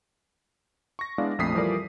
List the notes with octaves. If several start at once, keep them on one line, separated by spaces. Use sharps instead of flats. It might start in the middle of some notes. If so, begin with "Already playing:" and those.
C#6 A#6
G#3 B3 D4 E4 D5 F5
A#1 F2 A3 D#6 B6 C7
E3 F3 G3 A4 A#4 D5